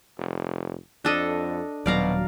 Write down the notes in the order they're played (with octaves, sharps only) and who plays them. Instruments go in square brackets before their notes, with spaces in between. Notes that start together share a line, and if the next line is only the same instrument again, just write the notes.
[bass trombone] F1
[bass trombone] F2 [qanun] D4 A4 D#5
[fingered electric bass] D#1 F#3 [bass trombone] B2 [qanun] D5 F5 A#5